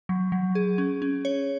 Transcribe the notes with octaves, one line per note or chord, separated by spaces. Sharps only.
F#3
F#3
G#4
C#4
C#4
C#5